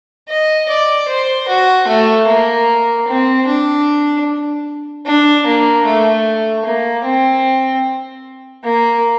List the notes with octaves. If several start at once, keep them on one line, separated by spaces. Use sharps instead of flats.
D#5
D5
C5
F#4
A3
A#3
C4
D4
D4
A#3
A3
A#3
C4
A#3